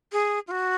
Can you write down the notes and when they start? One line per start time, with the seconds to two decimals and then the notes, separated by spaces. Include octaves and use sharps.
0.12 G#4
0.48 F4
0.51 F#4